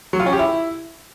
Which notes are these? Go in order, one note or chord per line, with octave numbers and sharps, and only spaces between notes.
F#3
F4
C#4
G4
E4